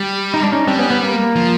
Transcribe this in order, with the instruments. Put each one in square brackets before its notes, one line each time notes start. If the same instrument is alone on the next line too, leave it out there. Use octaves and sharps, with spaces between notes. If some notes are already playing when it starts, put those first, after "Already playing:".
Already playing: [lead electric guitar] G3
[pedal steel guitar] D#4
D4
C#4 D#4
[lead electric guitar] G3 [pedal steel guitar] C4 D4
[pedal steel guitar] B3 C#4
B3
A#3
[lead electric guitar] F3